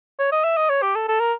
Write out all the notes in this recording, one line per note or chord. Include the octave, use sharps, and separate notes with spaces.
C#5
D#5
E5
D#5
C#5
G4
A4
A4
A#4